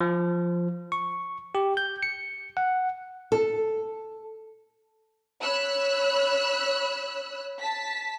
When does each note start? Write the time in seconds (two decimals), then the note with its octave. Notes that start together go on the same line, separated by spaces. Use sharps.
0.01 F3
0.92 C#6
1.55 G4
1.77 G6
2.03 C#7
2.57 F#5
3.32 A4
5.43 C#5 B5 E6 F#6
7.59 A5 B6